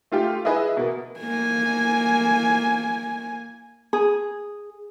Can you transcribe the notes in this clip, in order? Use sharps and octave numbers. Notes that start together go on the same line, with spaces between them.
A3 F4 G4
E4 G#4 B4 D#5 E5
B2 A#3
A#3 G#5
G#4